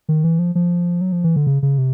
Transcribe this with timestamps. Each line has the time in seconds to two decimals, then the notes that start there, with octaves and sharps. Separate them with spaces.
0.09 D#3
0.24 E3
0.39 F3
0.55 F3
1.01 F#3
1.12 F3
1.24 E3
1.36 D3
1.47 C#3
1.62 C#3
1.78 C3